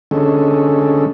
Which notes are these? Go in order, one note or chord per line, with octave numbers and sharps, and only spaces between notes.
D3 G#3 C#4 A4